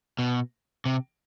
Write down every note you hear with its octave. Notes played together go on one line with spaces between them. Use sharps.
B2
C3